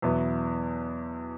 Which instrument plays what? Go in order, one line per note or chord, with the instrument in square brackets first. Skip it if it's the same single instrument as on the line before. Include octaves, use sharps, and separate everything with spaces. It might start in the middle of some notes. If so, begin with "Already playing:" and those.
[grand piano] E2 B2 F#3 B3 E4